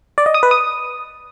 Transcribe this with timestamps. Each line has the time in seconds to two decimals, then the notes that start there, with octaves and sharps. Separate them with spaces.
0.18 D5
0.26 D#5
0.34 D#6
0.43 B4
0.51 D#6